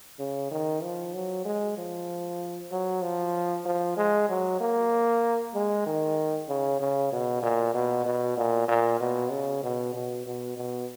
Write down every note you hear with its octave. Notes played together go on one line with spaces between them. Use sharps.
C#3
D#3
F3
F#3
G#3
F3
F#3
F3
F3
G#3
F#3
A#3
G#3
D#3
C#3
C#3
B2
A#2
B2
B2
A#2
A#2
B2
C#3
B2
B2
B2
B2